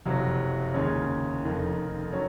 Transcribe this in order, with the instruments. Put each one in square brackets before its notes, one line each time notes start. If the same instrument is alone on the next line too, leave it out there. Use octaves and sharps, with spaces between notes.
[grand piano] F#1 F2 C3 F#3
D#2 C#3 G#3 C#4
F1 F2 D#3
F#3 C#4